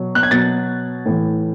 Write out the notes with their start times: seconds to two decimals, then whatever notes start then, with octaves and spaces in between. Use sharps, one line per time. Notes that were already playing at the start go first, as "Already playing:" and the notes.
Already playing: B2 F#3
0.15 F#6
0.23 G#6
0.31 B2 F#3 A6
1.06 A2 E3